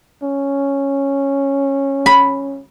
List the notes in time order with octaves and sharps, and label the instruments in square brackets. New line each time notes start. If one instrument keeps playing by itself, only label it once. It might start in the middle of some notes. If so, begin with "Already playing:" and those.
[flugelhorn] C#4
[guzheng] B5